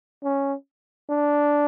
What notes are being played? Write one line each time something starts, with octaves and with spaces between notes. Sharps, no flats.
C#4
D4